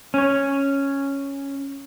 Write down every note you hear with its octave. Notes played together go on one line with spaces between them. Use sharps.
C#4 C#5